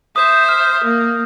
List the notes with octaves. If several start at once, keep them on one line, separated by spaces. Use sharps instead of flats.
C5 E5 D#6 G6
F6
A#3